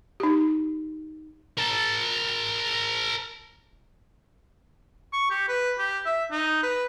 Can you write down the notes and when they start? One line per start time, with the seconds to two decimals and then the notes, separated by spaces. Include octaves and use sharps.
0.20 D#4 G4
1.58 A#4 A5
5.13 C#6
5.30 G4
5.48 B4
5.78 G4
6.06 E5
6.31 D#4
6.63 B4